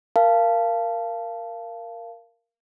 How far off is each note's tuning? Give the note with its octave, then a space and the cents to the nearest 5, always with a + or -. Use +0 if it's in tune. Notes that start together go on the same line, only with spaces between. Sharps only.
A#4 +0 F5 -20 A5 +0